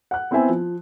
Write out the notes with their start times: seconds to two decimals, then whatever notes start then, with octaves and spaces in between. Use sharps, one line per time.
0.11 F#5 F#6
0.31 B3 C4 E4 C5 E5 G#5
0.49 F3